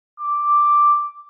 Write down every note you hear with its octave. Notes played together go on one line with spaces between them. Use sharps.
D6